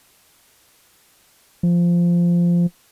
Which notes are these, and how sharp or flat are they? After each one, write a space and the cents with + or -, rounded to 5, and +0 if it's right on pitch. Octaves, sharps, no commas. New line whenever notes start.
F3 -10